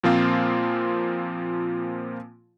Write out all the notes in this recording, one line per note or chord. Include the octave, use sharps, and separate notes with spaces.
A#2 F3 A#3 C4 F4